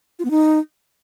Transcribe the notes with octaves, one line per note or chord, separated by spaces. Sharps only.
F4
B3
D#4